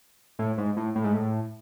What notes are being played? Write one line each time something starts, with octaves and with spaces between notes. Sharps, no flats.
A2
G#2
A2
A2
G#2
A2